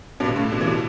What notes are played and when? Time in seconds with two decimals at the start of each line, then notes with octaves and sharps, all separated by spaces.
0.20 G2 B2
0.29 D3
0.36 A2 C#3
0.52 B2 D3
0.61 E3
0.66 B2 D3